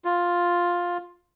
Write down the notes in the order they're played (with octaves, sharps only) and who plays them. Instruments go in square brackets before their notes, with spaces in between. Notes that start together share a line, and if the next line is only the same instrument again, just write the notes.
[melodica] F4